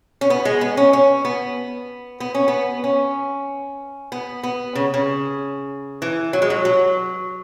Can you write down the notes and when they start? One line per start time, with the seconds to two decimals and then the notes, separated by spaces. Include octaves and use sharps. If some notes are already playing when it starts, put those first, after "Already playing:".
0.21 C#4
0.30 B3
0.45 G#3
0.61 B3
0.77 C#4
0.93 C#4
1.25 B3
2.20 B3
2.35 C#4
2.48 B3
2.84 C#4
4.12 B3
4.43 B3
4.75 C#3
4.94 C#3
6.02 E3
6.33 F#3
6.42 G#3
6.50 F#3
6.65 F#3